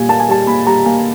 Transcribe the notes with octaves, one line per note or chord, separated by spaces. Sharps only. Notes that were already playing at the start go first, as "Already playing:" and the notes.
Already playing: A#2 G3 G#5
A#3 A5
G#5
G3 A5
A#2 B5
G3 A#5
A#3 G#5